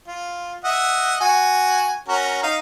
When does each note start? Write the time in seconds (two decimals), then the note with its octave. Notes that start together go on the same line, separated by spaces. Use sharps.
0.08 F4
0.65 D#5 E5 F#5
1.21 F#4 G#5
2.08 C#4 F#4 A#4
2.43 D#4 F5